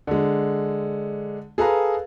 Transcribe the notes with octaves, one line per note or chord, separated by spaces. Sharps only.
D3 G#3
G#4 A4 B4 F5 A#5